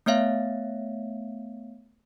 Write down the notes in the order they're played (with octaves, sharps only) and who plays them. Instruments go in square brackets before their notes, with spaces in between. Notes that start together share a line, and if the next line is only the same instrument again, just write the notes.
[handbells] A3 B3 C#5 E5 F5